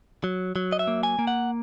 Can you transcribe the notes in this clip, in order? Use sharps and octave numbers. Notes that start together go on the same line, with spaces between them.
F#3
F#3
D#5
E5
A#3
G#5
A#3
F#5